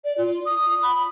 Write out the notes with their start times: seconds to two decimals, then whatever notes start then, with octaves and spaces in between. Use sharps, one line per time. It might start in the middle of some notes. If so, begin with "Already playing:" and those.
0.05 D5
0.18 F4
0.45 D#6
0.83 B5